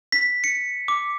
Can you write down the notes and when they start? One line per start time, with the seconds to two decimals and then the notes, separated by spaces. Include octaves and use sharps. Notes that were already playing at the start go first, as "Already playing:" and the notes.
0.12 B6
0.44 C#7
0.88 D6